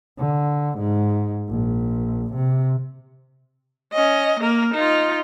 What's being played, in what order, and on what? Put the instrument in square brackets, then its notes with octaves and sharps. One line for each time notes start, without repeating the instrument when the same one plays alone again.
[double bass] D3
G#2
A#1
C3
[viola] C#4 D#5
A#3 A#4
D#4 F4